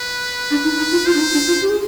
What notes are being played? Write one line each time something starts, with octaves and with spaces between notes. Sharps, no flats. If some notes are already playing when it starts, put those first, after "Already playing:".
Already playing: B4
D4
D#4
D#4
F4
F4 C5
D4
D#4
D4
F4
G4
G#4